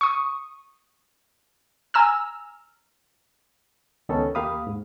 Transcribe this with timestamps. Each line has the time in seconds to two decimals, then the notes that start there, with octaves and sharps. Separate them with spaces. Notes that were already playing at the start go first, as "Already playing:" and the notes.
0.01 C#6 D#6
1.94 G#5 A#5 E6 F6
4.09 C#2 D#3 B3 C#4 D#4 A4
4.35 D#2 A#3 G4 F5 B5 D#6
4.67 G#2